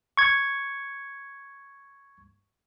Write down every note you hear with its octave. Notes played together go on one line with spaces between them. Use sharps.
C#6 G#6